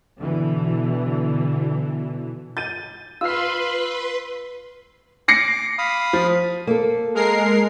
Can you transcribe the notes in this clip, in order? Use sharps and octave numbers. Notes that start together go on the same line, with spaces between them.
B2 D3 E3
G6 A6 D#7
F4 B4 B5 C6 E6 F6 C7
D6 A#6 C7 C#7
F5 B5 D#6
F3
A#3 A4
G#3 A#4 C7